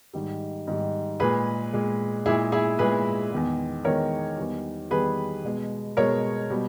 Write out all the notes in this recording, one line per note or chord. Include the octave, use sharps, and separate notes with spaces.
G#2 D#3 G3
G#2 D#3 G3
A#2 G#3 G#4 B4
A#2 G#3
A#2 G#3 E4 G#4
E4 G#4
A#2 G#3 G#4 B4
E2 D#3 G#3
E2 D#3 G#3 A#4 C#5
E2 D#3 G3
E2 D#3 G3 G#4 B4
B2 G#3
B2 G#3 A#4 C#5
B2 G3